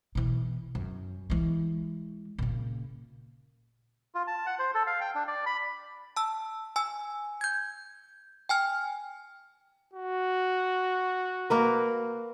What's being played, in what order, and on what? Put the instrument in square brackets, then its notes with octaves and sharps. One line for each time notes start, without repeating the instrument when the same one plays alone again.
[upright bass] B2 E3
F#2
E3 G#3
A#2 C#3
[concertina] F4
A5
F#5
C5
A4
F5
G5
D4
D5
B5
[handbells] A5 E6
G#5 E6
G6 G#6
G5 G#5 F6
[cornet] F#4
[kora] A#3 A#4 B4